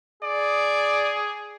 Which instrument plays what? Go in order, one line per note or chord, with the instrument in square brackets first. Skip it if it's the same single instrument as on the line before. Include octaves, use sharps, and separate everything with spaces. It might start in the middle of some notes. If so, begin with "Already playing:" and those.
[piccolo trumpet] G#4 [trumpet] D5